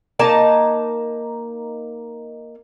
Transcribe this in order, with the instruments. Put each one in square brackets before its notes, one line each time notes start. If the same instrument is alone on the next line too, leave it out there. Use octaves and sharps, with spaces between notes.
[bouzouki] A#3 D#4 A5